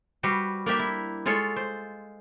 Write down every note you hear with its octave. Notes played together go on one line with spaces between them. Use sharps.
G3 F#4 B4 C5
A#3 D4 G4 E5
E4
G#3 F4 A4 C#5
C5